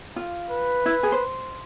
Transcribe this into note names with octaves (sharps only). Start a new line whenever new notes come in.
F4
B4
E4
G#4
C5